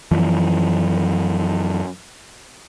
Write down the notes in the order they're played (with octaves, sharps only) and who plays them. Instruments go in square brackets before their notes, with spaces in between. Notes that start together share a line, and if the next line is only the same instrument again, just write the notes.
[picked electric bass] F#2 E3 F3